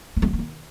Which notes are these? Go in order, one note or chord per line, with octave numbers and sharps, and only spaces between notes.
A#3
A3
G#3
A#3
D#3